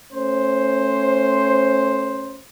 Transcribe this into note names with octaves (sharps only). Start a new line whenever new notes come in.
A3 C#4 C5